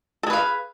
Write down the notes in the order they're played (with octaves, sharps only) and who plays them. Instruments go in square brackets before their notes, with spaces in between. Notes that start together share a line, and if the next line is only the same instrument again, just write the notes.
[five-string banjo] A4
G#4
B4
F5